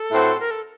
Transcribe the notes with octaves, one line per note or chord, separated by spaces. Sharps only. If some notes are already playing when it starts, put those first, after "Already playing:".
Already playing: A4
A2 A3 C4 F#4 C5
A#4
A4